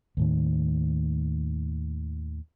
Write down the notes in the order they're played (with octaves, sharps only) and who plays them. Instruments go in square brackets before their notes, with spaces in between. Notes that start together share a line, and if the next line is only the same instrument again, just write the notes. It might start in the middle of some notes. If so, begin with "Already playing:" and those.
[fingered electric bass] D#2 A2 D#3